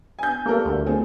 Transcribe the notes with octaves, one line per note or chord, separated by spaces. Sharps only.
G#5 G6
G3 A#3 A4 A#4
D2
A3 C4 G#4